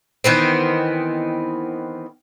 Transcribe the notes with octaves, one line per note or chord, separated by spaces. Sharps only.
D#3 E3 B3 C4